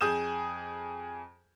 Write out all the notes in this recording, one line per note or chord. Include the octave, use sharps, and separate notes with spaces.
F2 G#4 G#5 D#6 G6 E7